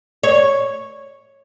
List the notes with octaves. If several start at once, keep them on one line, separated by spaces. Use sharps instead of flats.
C#5